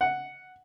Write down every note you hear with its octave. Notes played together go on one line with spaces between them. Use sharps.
F#5